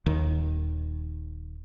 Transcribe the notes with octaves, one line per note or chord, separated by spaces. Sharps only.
D#1 D#2 D#3